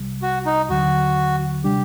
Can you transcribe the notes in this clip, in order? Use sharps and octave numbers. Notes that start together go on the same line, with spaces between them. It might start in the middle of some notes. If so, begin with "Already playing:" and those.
Already playing: C2 C3 G3
F#4
D#4
D#2 D3 F#3 F#4
C3 G3 D4 G4